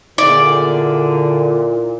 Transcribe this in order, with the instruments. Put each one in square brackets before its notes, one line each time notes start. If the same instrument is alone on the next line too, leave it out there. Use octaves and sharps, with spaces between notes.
[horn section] A#2 [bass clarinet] D3 [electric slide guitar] E4 G#4 [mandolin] D5